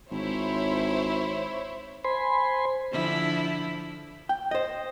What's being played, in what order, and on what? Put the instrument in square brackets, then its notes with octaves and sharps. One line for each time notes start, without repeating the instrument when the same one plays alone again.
[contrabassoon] G#1 [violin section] E4 C5 C#5
[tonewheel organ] C5 G#5 B5 C6
[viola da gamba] D3 F3 E4
[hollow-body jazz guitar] G5
C5 D#5